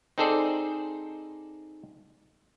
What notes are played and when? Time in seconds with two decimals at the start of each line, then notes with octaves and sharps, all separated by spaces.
0.18 C4 D#4 G#4 A4 C5 D5